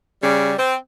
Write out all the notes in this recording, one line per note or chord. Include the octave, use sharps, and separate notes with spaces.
C#3 G3
C4